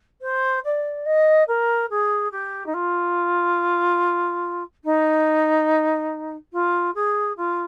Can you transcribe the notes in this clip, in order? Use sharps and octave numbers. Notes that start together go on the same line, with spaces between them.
C5
D5
D#5
A#4
G#4
G4
D#4
F4
D#4
F4
G#4
F4